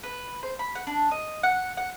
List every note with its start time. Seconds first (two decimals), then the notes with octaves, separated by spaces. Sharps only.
0.03 B4
0.43 C5
0.59 B5
0.75 F#5
0.87 D4
1.11 D#5
1.43 F#5
1.77 F#5